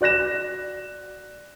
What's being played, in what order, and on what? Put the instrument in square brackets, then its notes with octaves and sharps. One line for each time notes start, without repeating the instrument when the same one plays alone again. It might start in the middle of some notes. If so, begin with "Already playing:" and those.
[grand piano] F#4 D5 F#6 A#6 E7